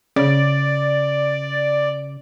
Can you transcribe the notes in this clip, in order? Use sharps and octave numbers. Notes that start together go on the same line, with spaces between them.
C#3 D5